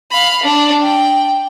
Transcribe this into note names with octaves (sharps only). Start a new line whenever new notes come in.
F5 B5
D4
G5